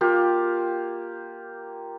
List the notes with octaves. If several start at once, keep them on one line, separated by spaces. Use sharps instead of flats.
A#3 F4 G4